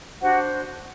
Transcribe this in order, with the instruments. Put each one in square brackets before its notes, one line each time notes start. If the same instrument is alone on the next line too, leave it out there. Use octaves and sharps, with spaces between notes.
[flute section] D4 F#4 G4 C5 F#5